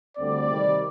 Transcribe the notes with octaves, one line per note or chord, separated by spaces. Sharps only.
D2 D3 G3 C4 D5
C3 D#3 G3